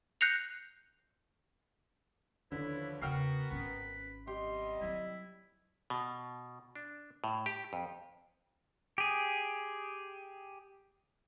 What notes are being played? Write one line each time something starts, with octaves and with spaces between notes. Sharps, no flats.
F#6 G6 A#6 C7 C#7 F7
D#2 D3 F3 E4 B4 C#5
E2 C#3 B3 F#4 A#4 G5 F6 C7
G#1 C#4 B4
C3 G3 G4 D#5 C6
F#3 C4 E4
B2
D4
A2
G4
F2
G4 G#4